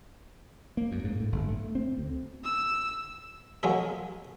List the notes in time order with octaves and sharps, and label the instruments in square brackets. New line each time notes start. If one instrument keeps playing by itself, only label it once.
[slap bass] A#3
F#2
G#2
A2
G1
A3
C4
D2
[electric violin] E6
[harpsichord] F#3 G#3 A#3 G#4 A4